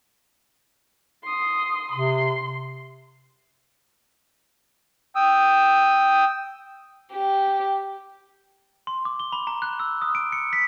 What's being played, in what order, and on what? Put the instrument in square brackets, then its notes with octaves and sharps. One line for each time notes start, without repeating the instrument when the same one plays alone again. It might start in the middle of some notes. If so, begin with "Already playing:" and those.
[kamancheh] C6 D#6
[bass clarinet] C3 [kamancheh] C6
[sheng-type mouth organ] G5 D#6 E6
[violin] G4
[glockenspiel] C6
D6
G7
B5
A#5
F#6
E6
D#6
D7
C#7
B6